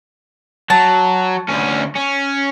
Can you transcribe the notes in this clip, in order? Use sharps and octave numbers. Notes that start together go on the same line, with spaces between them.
F#3 A5
D2 C#4
C#4